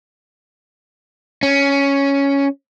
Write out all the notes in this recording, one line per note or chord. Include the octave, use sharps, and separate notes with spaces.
C#4